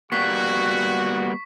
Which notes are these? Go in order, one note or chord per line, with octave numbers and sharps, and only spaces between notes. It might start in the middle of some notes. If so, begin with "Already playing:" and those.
G3 A#3 B3 F#4 C#6 F#6 B6 C7